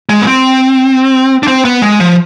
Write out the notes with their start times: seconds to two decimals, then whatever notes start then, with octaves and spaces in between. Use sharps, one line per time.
0.09 G#3
0.21 B3
0.27 C4
1.43 D4
1.47 C4
1.65 B3
1.82 G#3
2.00 F3